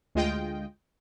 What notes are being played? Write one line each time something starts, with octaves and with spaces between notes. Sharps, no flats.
D2 G#3 F4 D#5 G5